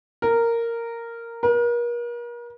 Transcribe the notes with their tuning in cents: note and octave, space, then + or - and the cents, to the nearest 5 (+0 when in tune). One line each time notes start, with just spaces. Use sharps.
A#4 -10
A#4 +40